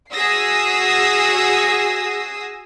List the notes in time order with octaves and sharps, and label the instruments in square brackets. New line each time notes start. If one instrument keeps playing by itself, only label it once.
[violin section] F#4 G#4 D#6 E6 A#6 C7